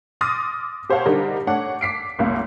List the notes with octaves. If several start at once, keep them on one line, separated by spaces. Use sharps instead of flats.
C6 D6 D#6 F6 A6 A#6
G4 C5 C#5 F5 F#5 A5
D3 G3 D#4 A#4
A3 D4 C#5 F#5
D6 B6 C7 D7
F#1 C2 A2 A#3